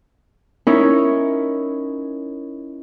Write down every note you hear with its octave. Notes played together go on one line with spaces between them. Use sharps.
C#4 D#4 E4 A#4 C#5